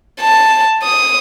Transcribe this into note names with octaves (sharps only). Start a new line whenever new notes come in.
A5
D#6